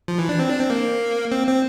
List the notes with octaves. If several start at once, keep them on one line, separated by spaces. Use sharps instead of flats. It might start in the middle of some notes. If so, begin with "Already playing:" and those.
F3
E3
D4
C4
D4
C4
A#3
C4
C4